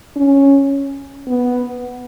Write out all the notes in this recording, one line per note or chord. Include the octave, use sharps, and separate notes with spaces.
C#4
B3